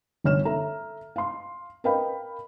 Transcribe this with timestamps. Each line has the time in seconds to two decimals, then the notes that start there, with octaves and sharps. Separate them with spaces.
0.24 G1 D3 C#5 F6 E7
0.45 A4 E5 A#5
1.16 F5 C6
1.84 A#4 B4 D#5 F5 G5 B5